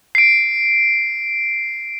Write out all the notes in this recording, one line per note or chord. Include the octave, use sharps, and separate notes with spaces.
C7 D7